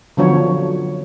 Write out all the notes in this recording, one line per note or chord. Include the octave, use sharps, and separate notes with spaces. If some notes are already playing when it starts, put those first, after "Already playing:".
D3 F3 F#3 B3 D4 C#5